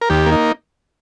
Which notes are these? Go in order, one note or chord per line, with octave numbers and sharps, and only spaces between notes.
A#4
D#2 G4
A#3
D#4